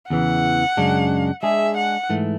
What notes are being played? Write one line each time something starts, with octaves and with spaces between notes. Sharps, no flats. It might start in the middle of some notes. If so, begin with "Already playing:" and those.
E2 C#3 E3 F#5
F#2 C#3 G#3 D4
G#3 D4 G#4 E5
F#5
G#2 E3 A3